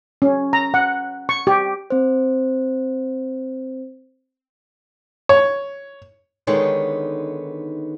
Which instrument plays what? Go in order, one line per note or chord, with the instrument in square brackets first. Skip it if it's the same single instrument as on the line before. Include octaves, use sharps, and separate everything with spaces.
[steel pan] C#4
A#5
F#5
C#6
G4
[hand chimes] C4 C5
[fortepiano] C#5
[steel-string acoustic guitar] D3 D#3 G#3 B3 D#4 C#5